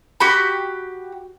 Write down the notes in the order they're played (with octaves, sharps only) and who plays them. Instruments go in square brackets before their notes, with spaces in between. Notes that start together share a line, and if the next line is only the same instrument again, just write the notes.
[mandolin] F#4 G4 B5